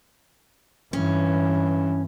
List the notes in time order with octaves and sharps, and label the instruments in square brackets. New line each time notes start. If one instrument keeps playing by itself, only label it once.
[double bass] G2 E3 [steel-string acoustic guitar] C#4